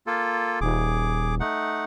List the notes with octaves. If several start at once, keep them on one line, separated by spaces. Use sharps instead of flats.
A#3 F4 A4
D#1 G#4 D6
A3 D#4 F#5